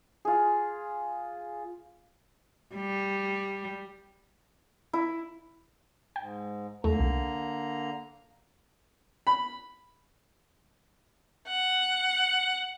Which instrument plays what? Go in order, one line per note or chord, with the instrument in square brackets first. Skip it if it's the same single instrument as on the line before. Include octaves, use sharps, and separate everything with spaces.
[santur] F4 G#4
[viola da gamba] G3
[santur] E4
[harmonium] G#2 [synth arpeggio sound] G5
[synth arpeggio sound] E2 A3 [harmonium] D3 A#3 A#5
[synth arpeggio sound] C2
[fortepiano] B5
[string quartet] F#5